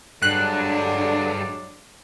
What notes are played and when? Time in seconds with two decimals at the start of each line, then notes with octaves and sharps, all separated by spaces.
0.22 G2 D3 F#3 G#3 D4 F#6